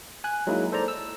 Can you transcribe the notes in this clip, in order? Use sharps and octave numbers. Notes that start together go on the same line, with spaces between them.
G#5 F#6
F#3 G#3 A#3 D#4 E4
A4 C5 D5 A#5
E6